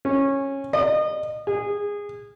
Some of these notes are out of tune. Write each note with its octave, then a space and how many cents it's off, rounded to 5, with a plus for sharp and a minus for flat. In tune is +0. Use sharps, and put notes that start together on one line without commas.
C#4 -15
D#5 -30
G#4 -20